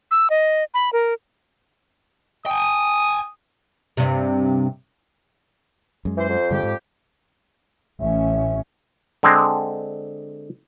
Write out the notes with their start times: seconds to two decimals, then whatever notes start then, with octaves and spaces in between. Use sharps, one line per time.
0.11 E6
0.30 D#5
0.74 B5
0.93 A#4
2.46 G5 G#5 D#6
3.97 G2 C3
6.05 F#2 G#3
6.17 E3 C5
6.29 F2
6.51 G2 D3 G#3 G4
6.63 G#2
8.00 A1 C#4 E5
9.23 D3 G#3 C4